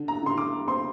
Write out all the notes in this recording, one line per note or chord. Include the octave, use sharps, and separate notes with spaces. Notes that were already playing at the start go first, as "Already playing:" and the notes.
Already playing: D3
A#5
D3 C6
D6
C4 C6